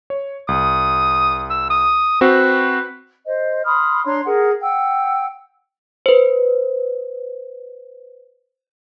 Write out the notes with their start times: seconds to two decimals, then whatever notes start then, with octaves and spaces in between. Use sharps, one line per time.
0.10 C#5
0.48 C2 D#6
1.50 E6
1.70 D#6
2.21 C4 F#4 B4 C5
3.26 C5 D#5
3.65 B5 C6 D#6 F6
4.05 D4 C#5 A#5 C6
4.27 G#4 A#4 F#5
4.62 F#5 G5 E6
6.06 B4 C5